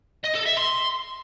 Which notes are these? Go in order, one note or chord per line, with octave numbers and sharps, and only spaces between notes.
D#5
A4
E5
C6